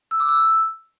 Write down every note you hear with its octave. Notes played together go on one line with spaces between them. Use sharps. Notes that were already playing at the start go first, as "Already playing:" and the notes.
E6
D6
E6